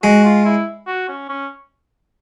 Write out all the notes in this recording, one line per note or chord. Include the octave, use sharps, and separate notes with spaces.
G#3 F#4
F4
E4
F#4
C#4
C#4